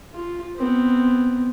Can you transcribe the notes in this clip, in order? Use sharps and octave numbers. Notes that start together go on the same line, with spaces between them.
F4
B3 C4